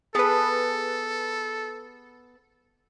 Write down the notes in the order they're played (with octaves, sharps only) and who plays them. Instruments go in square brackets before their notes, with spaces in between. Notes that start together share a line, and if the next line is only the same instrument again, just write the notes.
[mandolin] B3 A5 B5 [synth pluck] G#4 B4 [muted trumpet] A4